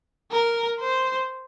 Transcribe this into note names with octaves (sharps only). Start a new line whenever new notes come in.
A#4
C5